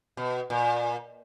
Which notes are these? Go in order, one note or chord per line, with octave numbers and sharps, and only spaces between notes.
B2
A#2